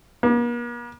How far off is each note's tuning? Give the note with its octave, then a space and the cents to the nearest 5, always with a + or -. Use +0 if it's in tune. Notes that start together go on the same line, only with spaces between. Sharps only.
A#3 +45